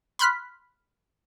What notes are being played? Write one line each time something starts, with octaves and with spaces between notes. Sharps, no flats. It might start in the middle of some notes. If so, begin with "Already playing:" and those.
B5 C6 F6 F#6 B6